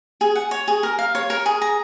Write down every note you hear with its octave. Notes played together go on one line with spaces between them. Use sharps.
G#4
F#5
C#5
G#4
A#4
F5
C#5
A#4
G#4
A#5